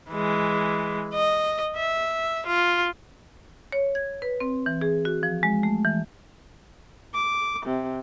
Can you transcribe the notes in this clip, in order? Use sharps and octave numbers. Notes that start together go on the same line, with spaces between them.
E3 G#3
D#5
E5
F4
C#5
G#6
B4
C4
E3
G#4
F#4
F3
G#3
A3
E3
D6
C3